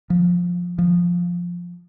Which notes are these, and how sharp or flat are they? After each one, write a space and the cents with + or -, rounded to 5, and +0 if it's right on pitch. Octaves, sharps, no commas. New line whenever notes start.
F3 +15
F3 +5